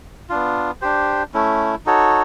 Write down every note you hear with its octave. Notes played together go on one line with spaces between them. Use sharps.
B3 D4 F4
D4 G4 C5
A3 C#4 E4
D#4 F#4 A4 C#5